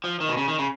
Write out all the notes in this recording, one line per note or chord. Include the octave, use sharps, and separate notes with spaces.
F3
D#3
B2
C#3
D#3
C#3